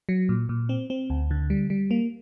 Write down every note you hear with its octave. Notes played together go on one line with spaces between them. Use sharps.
F#3
A#2
A#2
C4
C4
D2
D3
G3
G3
A#3